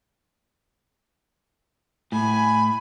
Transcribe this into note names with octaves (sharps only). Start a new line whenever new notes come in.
A2 G#5 B5